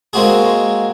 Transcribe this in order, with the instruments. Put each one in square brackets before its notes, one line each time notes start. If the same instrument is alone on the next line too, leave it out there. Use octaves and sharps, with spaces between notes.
[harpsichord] G#3 A#3 C4 F#4 G#4